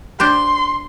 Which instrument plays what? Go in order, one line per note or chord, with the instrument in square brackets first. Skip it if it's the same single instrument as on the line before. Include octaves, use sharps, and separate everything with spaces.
[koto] D4 G4 C5 [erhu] C6